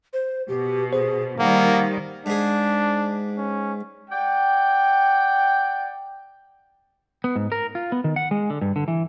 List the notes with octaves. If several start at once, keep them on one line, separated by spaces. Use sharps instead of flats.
C5
B2 G4
G#4 C5
D#3 G3 A#3 F#5
G#2 D4 G#4
C#4
D5 F#5 G5
B3
G#2
A#4
F4
B3
D#3
F#5
G#3
D3
G2
D3
E3